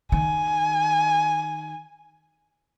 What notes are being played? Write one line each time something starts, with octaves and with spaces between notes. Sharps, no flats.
D#3 G#5